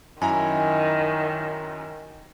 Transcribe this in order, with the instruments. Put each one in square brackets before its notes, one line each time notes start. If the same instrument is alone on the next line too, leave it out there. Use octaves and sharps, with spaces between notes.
[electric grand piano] F#2 E4 A#5 [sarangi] D#3 [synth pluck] G#5